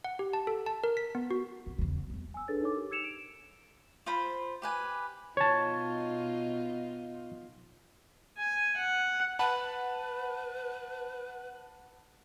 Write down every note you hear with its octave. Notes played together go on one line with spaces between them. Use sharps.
F#5
G4
A5
A4
A5
A#4
B6
B3
F#4
C2
E2 C#3
E2 G3
G#5 E6
D4 G#4 A4 B4 C#5 A6
D#4 A4 C#5 D6
G4 A#4
E6 G#6 C#7 E7 F7
D7
F4 C5 B5
G4 B4 G#5
B2 D#4 F4 C#5 A5
G#5
F#5
B4 F#5 A5 B5